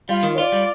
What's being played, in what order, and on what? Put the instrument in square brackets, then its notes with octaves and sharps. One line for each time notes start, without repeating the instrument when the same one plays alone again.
[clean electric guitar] G3 [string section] F4
[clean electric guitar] D#3
[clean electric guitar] F4 [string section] D5
[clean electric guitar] G3